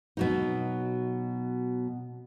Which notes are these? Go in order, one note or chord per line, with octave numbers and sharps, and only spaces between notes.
B2 F#3 D#4